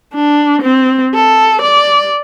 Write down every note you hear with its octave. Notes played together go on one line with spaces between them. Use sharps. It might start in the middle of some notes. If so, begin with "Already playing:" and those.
D4
C4
A4
D5